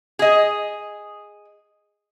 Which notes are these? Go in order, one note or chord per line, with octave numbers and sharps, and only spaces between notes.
G#4 D#5